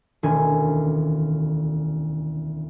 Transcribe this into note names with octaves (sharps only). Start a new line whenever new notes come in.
E1 D2 D#3 C#4 G#5